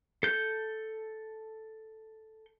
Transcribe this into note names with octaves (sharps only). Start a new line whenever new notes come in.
A4 G6